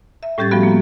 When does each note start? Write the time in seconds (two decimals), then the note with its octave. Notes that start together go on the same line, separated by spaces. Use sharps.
0.23 E5
0.38 A2 G3 C#4 G4 G#6 A6
0.51 F3 G3 A3 B3 F#4
0.63 A#3